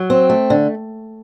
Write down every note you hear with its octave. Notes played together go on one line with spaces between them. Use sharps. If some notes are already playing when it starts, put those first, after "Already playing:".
Already playing: F#3
C4
A3
D3